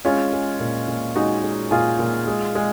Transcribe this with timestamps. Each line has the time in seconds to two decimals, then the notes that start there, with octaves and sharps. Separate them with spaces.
0.05 G#3 C#4 F4
0.33 G#3
0.60 A#2
0.88 A#2
1.16 G#3 D#4 F#4
1.44 G#3
1.71 A#2 F4 G#4
1.99 A#2
2.27 G#3
2.55 G#3